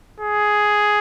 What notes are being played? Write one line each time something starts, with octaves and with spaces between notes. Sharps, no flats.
G#4